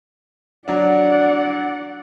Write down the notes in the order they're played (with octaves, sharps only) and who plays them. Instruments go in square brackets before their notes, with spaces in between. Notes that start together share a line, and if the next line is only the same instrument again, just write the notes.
[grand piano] F#3 D4 [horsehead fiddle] D5 F#5